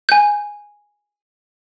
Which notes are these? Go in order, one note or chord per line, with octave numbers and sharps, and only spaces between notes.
G#5 G6